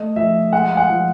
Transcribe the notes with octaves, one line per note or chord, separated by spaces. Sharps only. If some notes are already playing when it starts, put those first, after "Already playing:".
Already playing: A3 D#5
F3 E5
G#3 F#5
F5
F#5
F3